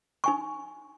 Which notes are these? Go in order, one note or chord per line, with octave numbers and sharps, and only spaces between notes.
D#4 G#5 C#6